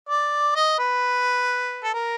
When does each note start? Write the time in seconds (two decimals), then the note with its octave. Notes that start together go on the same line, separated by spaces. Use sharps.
0.09 D5
0.56 D#5
0.79 B4
1.84 A4
1.94 A#4